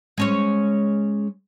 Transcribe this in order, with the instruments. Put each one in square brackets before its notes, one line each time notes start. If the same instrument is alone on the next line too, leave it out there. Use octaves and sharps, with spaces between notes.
[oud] G#3 C#4 C#5